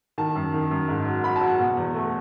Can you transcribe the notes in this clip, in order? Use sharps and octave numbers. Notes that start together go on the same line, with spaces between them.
D#3 A5
F#2
D#3
F#2
G#2
F#3
F#3 B5
A5
F#3
F#5
B2
E2
A3